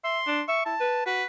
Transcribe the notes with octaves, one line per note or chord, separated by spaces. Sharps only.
E5 C6
D4
E5 C#6
E4 A5
B4
F#4 B4